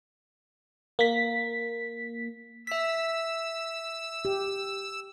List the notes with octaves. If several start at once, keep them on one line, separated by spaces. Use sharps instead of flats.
A#3 B6
E5 E6 B6
G4